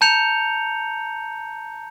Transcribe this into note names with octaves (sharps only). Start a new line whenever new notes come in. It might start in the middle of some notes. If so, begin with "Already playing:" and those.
A5 A#5 G6 C#7 F7